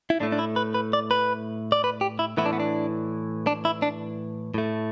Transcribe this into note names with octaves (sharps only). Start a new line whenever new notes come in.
E4
A2 A3 D4
D4
E4
B4
B4
D5
B4
D5
B4
G4
E4
A2 E3 B3 E4
D4
B3
D4
D4
E4
D4
A2 A3